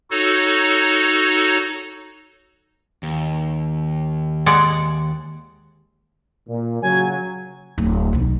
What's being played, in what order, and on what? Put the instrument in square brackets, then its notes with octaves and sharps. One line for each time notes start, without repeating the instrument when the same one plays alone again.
[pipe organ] D#4 F#4 A4 C#5
[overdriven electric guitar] D#2
[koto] G#3 D5 F#5
[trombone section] A#2
[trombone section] C#3 F#3 [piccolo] G#5
[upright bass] D1
B1 B2